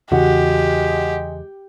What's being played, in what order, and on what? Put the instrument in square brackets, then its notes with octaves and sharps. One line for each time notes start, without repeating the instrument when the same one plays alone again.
[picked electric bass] E2 C#3 [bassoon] G#3 [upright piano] F#4 [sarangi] G4